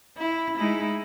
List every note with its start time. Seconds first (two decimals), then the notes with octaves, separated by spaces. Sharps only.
0.17 E4
0.57 G#3 D#4 E4